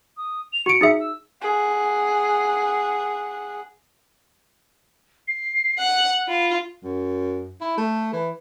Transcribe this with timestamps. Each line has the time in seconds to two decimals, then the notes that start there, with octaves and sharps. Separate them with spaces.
0.17 D#6
0.53 F7
0.66 F#4 C#7 D7
0.81 D#4 G#4 E5
1.00 E6
1.42 G#4 F#5
5.28 C7
5.78 F#5 F#6
6.28 F4 B5
6.83 F#2
7.61 E4
7.77 A3
8.13 E3